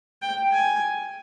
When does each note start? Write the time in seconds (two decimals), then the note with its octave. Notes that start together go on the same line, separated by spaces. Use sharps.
0.22 G5
0.52 G#5